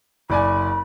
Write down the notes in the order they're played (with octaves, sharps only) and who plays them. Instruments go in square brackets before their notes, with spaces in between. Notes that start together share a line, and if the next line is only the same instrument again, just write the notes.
[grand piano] F#1 D5 G#5 [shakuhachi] B5